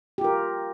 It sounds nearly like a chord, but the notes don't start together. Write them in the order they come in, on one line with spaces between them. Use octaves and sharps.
G4 F4 A#4